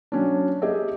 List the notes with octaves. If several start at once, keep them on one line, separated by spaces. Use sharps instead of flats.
F#3 C#4 D4
G4 G#4 D#5 E5